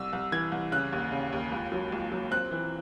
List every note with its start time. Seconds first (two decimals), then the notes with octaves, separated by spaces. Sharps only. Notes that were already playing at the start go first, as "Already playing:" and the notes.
Already playing: C2 E6
0.13 C2
0.32 E3 G#6
0.52 C2
0.72 C#3 F#6
0.93 D#2
1.12 C#3
1.33 D#2
1.52 C#2
1.72 F#3
1.92 C#2
2.12 F#3
2.31 C4 F#6
2.51 E3